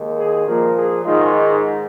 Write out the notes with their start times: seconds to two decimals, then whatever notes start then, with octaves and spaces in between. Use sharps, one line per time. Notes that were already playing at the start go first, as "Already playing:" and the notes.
Already playing: D#2 D#3 G#3
0.19 G#4
0.47 A#2 F3 A#3 A#4
0.77 G#4
1.04 G#2 D#3 G#3 F4